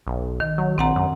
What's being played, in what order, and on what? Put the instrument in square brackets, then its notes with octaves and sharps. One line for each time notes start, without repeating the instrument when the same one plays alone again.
[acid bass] B1
[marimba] D#3
[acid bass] F#3
[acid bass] A#1 [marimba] C4 F#5 A#5
[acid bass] F#2